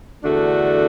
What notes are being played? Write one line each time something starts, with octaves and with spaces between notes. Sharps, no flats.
E2 D3 A3 D4 F#4